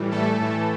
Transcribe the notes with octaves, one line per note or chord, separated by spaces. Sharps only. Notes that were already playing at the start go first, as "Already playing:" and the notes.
Already playing: A2 E3 G3
A3 A4
A2 E3 A3